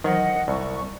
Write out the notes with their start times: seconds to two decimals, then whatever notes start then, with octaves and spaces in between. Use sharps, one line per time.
0.04 D#3 E3 F#3 C5 D#5 F#5
0.48 C2 C#6